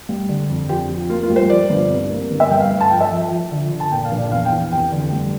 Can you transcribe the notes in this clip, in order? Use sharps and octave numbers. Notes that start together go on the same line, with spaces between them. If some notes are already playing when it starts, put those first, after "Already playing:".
G3
D3
F2
F3 G4
F3
A#3 F4
F4
G3
C5
F3 D5
G1
C2
A#3
G1
E5
G2 G5
F5
A3
A5
F3 G5
E5
F3
F3
D3
D3
A5
A#2 G5
F5
A#1
D5
E2 F5
G5
E3
F1 G5
D3
G3